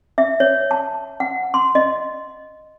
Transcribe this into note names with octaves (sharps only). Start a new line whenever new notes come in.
E5
C#5
A5
F#5
C6
D#5